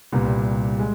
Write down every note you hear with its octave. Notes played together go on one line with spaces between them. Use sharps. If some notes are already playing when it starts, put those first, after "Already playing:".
C2 A#2 G3 B3
G#3